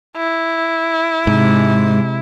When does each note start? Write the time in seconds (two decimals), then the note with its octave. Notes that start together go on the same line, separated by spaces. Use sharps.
0.17 E4
1.27 G#2 C3 G#3